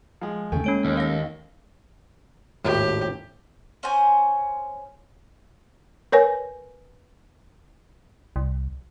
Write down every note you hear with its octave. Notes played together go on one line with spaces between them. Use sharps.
F3 G#3
D#2 C#3 A3 G5 G#5
G#3 A#3 C#4 C#5 D7
D#2
F5 A#6
G#1 D#2 A2 G4
C#4 C5 G#5
A#4 B4 C#5 G#5
C2